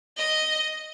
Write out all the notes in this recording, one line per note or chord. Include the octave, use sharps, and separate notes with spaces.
D#5